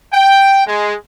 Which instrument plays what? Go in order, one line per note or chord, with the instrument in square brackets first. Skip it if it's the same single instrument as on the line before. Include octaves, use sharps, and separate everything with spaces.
[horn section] G5
G#3